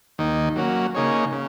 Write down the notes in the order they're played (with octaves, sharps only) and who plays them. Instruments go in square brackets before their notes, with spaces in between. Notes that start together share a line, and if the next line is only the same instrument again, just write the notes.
[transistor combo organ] D#2 D#3 A#3 D#4
F#3 A#3 C#4 F#4
C#3 A#3 D#4 G#4 C#5
C#3